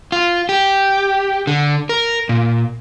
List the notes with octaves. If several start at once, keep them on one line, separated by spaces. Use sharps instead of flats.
F4
G4
D3
A#4
A#2